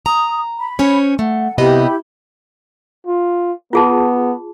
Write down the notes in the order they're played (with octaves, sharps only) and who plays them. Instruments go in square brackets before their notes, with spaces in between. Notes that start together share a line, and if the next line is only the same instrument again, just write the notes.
[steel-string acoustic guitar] A#5 [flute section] D#6
[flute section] B5
[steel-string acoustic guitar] C#4 C5 C#5
[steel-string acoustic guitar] A3 [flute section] F#5
[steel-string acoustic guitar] C3 B3 D#5 [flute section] E4 G4 B5
[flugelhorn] F4
[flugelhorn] B3 [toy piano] F4 G#4 A5